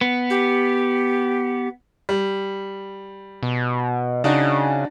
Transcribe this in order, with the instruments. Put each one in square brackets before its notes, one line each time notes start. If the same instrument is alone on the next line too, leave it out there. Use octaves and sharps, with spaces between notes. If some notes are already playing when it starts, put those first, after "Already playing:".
[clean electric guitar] B3
[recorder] G4
[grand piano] G3
[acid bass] B2
[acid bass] C#3 [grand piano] D4 D#4 F#4